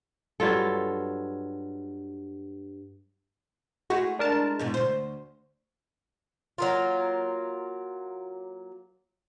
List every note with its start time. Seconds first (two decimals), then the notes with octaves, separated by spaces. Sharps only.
0.40 G2 F#3 F4 A4
3.90 G#3 A3 E4 F#4
4.19 D4 A#4 A5
4.59 E2 G#2 B2
4.74 D2 C5
6.58 F#3 A#3 F4